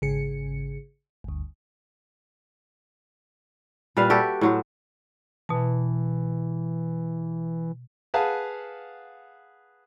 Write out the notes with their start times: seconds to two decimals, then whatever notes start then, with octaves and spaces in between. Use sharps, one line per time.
0.02 G#1 C#3 G#4 C#7
1.24 G1 D2
3.97 A#2 G3 B4 F5
4.10 F#4 G4 A4 E5
4.41 A2 F#3 C5
5.49 B2 E3 A5
8.14 G#4 B4 F5 F#5 A5